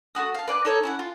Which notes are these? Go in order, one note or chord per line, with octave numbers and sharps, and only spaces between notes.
A3 E4 F#4 D#6
F5 A5
B4 D5 G5 F#6
D#4 A4 C#5
C#4 E4 F#5
F4